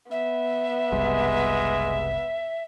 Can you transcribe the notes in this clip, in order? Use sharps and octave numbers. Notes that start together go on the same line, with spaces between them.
B3 E5
F#1 C2 G3 G#3